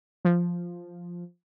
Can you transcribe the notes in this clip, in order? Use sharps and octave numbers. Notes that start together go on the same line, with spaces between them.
F3